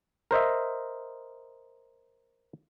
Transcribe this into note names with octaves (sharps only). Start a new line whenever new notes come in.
A#4 C5 D#5 E5